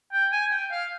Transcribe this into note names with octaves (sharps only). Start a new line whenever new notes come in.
G5
G#5
G5
F5